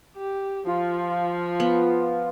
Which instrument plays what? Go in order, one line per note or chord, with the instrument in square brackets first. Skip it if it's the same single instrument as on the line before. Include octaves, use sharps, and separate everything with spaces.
[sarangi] G4
[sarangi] F3 [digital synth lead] F4
[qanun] B3